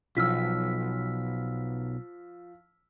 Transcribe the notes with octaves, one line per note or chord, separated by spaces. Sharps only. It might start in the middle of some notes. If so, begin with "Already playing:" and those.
B1 F3 E6 F6 B6